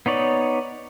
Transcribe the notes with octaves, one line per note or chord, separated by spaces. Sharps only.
B3 D#4 C#5 D5